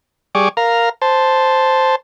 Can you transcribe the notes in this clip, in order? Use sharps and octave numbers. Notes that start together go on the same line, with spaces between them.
G3 G#4 D5 C#6 D6
A#4 F5 A#5
C5 A5